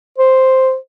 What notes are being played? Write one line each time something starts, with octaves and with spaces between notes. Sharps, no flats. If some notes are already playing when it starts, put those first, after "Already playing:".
C5